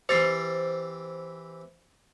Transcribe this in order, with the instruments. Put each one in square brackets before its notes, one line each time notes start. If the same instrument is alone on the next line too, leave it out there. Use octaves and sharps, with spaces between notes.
[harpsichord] E3 C4 G4 [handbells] C5 A6 C7